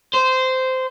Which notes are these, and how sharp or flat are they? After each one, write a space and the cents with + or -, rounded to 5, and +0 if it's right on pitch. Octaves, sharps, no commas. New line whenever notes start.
C5 -15